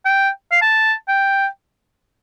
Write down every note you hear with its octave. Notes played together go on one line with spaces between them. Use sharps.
G5
F5
A5
G5